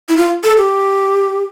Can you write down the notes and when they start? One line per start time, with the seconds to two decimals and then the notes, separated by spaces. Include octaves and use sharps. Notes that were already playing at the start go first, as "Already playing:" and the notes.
0.09 E4
0.17 F4
0.44 A4
0.58 G4